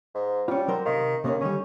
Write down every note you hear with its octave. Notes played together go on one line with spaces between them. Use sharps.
G#2
G3 C#4 F4
F#3 A#4 C5
C3 D#3 F5
D#2 C3 A#3 C#4
D3 D#3 G3 C#4